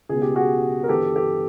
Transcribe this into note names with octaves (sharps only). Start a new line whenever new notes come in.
C#2 B2 G#4
G4
F#4 G#4
A#4
G1 G2 E3 G4 A4
G4 A4